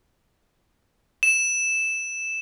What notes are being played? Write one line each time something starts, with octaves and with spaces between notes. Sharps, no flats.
E7